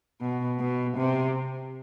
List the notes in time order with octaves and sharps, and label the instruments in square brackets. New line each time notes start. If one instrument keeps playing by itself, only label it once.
[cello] B2
B2
C3